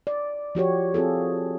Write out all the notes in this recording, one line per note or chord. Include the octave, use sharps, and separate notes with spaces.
D5
F3 F#4 G4 C#5
C4 F4 G#4 A4